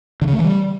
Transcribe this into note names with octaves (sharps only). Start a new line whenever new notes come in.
D3
C#3
A3
E3
G3